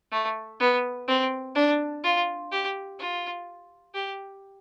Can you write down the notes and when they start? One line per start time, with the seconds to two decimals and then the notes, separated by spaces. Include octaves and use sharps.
0.12 A3
0.60 B3
1.08 C4
1.55 D4
2.04 F4
2.52 G4
2.99 F4
3.94 G4